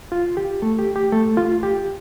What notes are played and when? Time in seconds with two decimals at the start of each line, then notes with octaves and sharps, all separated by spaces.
0.12 F4
0.37 G4
0.62 A3 A4
0.79 G4
0.96 G4
1.12 A3 A4
1.37 F4
1.63 G4